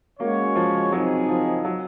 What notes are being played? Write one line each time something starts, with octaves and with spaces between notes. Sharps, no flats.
G#3 A#3 C#4 F#4 C#5
F3
F#3 C4 D#4 G#4
F3
F#3